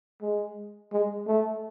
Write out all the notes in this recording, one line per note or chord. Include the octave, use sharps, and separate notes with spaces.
G#3
G#3
A3